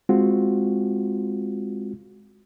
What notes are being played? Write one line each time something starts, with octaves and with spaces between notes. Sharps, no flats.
G#3 C4 F4 F#4